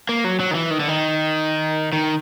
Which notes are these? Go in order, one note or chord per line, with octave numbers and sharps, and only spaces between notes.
A#3
F#3
F#3
D#3
E3
D#3
D3
D#3
D#3